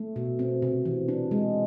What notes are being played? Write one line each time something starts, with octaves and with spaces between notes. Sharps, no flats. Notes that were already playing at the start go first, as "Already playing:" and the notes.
Already playing: A3
B2
C4
C3
E3
D4
G#3